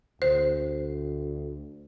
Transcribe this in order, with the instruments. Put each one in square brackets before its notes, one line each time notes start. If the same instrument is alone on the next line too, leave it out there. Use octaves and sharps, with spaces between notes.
[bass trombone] D2 [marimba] C5